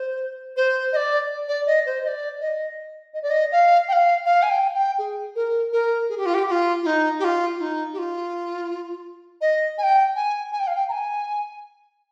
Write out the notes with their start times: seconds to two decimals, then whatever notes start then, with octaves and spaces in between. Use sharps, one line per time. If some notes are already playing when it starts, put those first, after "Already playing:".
Already playing: C5
0.56 C5
0.92 D#5
0.96 D5
1.48 D5
1.66 D#5
1.86 C5
2.03 D#5
2.08 D5
2.40 D#5
3.14 D#5
3.22 D5
3.30 D#5
3.52 F5
3.88 G5
3.93 F5
4.25 F5
4.42 G#5
4.50 G5
4.74 G5
4.98 G#4
5.35 A#4
5.72 A#4
6.09 G#4
6.17 G4
6.26 F4
6.34 G4
6.47 G4
6.51 F4
6.83 F4
6.86 D#4
7.19 G4
7.24 F4
7.57 F4
7.61 D#4
7.93 G4
7.98 F4
9.41 D#5
9.78 G#5
9.83 G5
10.15 G#5
10.52 G#5
10.59 G5
10.67 F5
10.75 G5
10.89 A#5
10.92 G#5